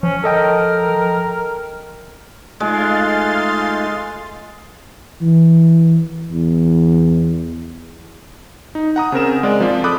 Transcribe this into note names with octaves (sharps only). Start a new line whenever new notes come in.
F3 C#4
A4 A#4 D#5 G5
G#3 A3 D#4 F4 F5 C6 A6
E3
E2
D#4
F#5 A#5 D#6
C#3 C4 A#4 E7
G#3 D5
F3 C4 F4 D5
A4 B5 D6 D#6 F#6